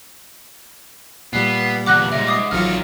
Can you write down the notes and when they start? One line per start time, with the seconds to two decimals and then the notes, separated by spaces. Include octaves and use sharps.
1.33 A#2 G3 B3 C7
1.86 E2 G2 F#5 D6 F#6 A#6
2.12 C2 G#2 E5 A#6
2.27 D6 D#6 C7
2.51 A1 G#2 D#3 F#3 F4 F6